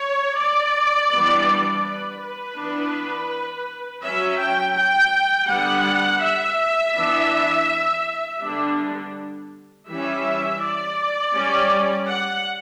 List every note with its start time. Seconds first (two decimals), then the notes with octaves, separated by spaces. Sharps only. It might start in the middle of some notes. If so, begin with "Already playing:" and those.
Already playing: C#5
0.37 D5
1.11 E3 G3 B3 D4
1.84 B4
2.21 B4
2.56 E3 B3 D4
4.03 F#3 C#4 E5
4.40 G5
4.76 G5
5.49 D3 G3 B3 F#5
6.22 E5
6.95 E3 B3 D4
8.42 D3 G3 B3 D4
9.89 E3 G3 C#4 E5
10.62 D5
11.35 G3 C#4
12.08 F#5